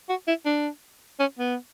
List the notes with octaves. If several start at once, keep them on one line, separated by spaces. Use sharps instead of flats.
F#4
E4
D4
C#4
B3